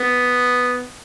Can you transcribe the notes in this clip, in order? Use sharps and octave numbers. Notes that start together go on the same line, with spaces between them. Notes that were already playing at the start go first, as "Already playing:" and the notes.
Already playing: B3